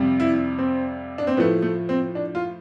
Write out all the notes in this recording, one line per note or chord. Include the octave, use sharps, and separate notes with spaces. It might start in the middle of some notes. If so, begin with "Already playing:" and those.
Already playing: F2 C3 G3
E4
C4
D4
C4
A2 F3 A3 B3
A3
C4
D4
F4